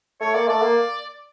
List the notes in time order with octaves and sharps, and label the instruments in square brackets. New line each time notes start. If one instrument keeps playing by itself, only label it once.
[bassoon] A3 [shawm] C#5
[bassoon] A#3 [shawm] D5
[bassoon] A3 [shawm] D5
[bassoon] A#3